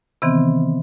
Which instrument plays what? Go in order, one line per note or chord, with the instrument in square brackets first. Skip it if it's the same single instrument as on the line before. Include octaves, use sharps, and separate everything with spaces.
[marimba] C3 D#3 E3 B3 C4